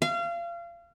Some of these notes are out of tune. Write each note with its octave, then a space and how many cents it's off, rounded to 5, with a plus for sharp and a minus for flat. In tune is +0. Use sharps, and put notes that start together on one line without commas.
F5 -30